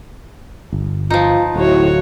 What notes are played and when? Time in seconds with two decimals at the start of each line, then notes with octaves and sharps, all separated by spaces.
0.72 G1
1.10 F3 D#4 F4
1.56 D1 A2 F#4 C#5